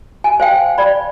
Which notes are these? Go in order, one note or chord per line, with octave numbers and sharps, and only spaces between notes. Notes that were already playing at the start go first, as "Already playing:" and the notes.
G#5
C5 F5 G5
D5 B5